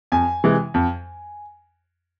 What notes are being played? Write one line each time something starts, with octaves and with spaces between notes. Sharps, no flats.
F2 G#5
C3 E3 G#3
F2